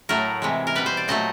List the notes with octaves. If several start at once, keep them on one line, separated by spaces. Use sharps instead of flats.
A2 F#3 A3 A#4
C3 E3 G#3
A#4
B2 G3 B4
C5
D5
A#2 F#3 A3 D#5